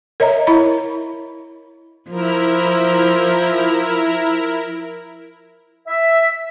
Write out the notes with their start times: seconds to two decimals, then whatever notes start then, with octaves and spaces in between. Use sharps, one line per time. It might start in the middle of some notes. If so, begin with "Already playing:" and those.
0.20 A#4 C#5 D#5 E5 A#5
0.47 E4 B5
2.10 F3 E4 A#4
5.88 E5